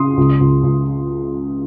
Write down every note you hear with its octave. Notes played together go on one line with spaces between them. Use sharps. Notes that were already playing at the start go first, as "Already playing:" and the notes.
Already playing: C#3 C6 D#6
C#2
C#2
C#2